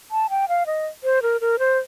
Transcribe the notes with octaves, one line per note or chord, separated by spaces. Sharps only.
A5
G5
F5
D#5
C5
A#4
A#4
C5